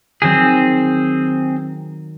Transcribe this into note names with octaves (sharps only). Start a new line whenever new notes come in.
D#3 F#3 C4 G#4